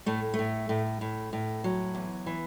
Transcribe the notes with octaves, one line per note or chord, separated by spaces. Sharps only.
A2 A3
A3
A2
A2
A2
A2
F#3
E2
E3